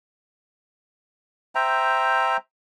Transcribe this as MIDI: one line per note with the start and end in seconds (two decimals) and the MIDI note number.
1.55 2.37 72
1.55 2.37 76
1.55 2.37 79
1.55 2.37 82